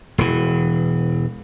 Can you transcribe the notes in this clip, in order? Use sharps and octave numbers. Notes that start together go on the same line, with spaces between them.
E1 E3